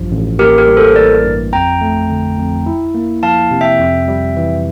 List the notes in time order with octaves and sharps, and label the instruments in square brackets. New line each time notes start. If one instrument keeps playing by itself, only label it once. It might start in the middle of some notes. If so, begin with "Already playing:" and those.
Already playing: [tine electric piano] A1 G2 F3
A1
[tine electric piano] A#3 [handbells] G4 A#4
[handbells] G4 A#4
[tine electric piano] G3
[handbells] A4 C5
[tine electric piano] E3 [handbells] A#4 D5
[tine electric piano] G2
[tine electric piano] F2 [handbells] G5 A#5
[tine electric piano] A3
D3
F2
E4
A#3
[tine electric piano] F3 [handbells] F5 A5
[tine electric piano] C3
[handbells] E5 G5
[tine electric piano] F2
G3
E3